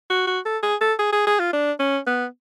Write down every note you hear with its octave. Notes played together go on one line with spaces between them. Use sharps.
F#4
F#4
A4
G#4
A4
G#4
G#4
G#4
F4
D4
C#4
B3